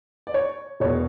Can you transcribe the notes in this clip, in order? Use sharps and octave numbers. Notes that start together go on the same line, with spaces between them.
D5
C#5
E1 E2 B2 C#5